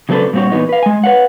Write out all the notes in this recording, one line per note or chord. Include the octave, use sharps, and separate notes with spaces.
C#3 F#3 C4 D4 A4 B4
G2 A#2 C4 F#4 C#5
A#2 E3 B3 D#4 C#5
B4 F5
G#3 G#5
B4 C#5 F5 F#5